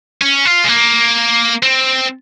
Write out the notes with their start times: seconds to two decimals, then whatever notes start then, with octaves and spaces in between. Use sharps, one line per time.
0.21 C#4
0.45 F4
0.64 G#3
0.69 A#3
1.63 C4